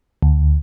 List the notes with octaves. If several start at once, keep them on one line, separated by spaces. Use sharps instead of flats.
D2